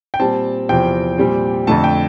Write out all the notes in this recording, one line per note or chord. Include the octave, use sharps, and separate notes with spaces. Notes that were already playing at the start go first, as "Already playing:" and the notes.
G5
A#2 G3 C4 A5
E2 C3 F3 C4 G5
A#2 G3 C4
F2 D3 A3 A5
G5